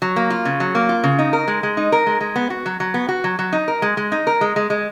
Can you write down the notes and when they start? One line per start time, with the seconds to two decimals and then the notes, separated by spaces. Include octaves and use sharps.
0.02 F#3
0.16 A#3
0.30 F4
0.45 C#3
0.60 F#3
0.75 A#3
0.89 F4
1.04 C#3
1.19 D#4
1.33 A#4
1.48 G#3
1.63 G#3
1.77 D#4
1.92 A#4
2.07 G#3
2.21 G#3
2.36 B3
2.50 F#4
2.66 F#3
2.80 F#3
2.94 B3
3.09 F#4
3.24 F#3
3.39 F#3
3.52 D#4
3.68 A#4
3.82 G#3
3.97 G#3
4.12 D#4
4.27 A#4
4.41 G#3
4.56 G#3
4.70 G#3